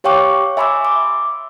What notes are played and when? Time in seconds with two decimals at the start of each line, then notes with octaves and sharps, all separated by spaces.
0.04 G4 C#5 F5 G5 C#6 D6
0.57 E5 G#5 B5 C6 D6 E6
0.85 D6